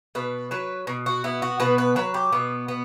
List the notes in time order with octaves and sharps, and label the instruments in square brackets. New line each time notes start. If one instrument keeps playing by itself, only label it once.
[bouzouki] B2 B4
F#3 B4
B2
F#4
B3 E4
F#4
B2 B4
B4
F#3 B4
G4
B2 B3
B3